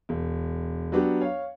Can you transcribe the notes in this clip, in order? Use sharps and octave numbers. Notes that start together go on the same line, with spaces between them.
E1
F#3 B3 D4 F#4 G4
C#5 F5